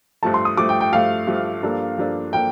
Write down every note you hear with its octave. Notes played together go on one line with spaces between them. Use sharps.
G2 F3 A3 A5
C6
D#6
G2 F3 A3 D6
G5
G5
G2 F3 A3 F5
G2 F3 A3
G2 F3 A#3 D4 A4
G2 F3 A#3 D4 A4
F3 A#3 D4 A4 G5